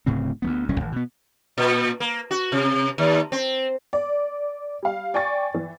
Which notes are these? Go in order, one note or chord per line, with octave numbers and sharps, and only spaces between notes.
D1 A2 C#3 C4
D2 A3 B3
D#1 C2 F#3 C#4
G#1
B2 B3
A#2
A#3
F#4
C3
D#2
C4
D5
G3 F5
D5 G5 G#5 C#6 A6
E3